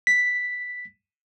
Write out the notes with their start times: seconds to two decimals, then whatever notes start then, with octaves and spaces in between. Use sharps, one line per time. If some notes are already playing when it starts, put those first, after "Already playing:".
0.07 B6